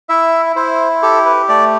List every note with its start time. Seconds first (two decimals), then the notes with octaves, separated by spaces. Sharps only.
0.09 E4 E5
0.56 E4 C5
1.02 G4 A4
1.26 B4
1.49 A3 D5